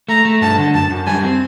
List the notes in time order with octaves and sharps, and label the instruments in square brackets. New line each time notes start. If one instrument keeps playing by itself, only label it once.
[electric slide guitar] A3 [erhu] A#5
[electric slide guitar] A3
[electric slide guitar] G2 [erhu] A5
[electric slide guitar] D3
[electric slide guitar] F#2 [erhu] A5
[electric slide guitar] F#2
[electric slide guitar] G3 [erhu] G#5
[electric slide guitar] C4